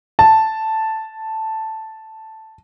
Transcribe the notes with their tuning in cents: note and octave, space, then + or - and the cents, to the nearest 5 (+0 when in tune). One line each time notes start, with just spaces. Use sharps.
A5 +0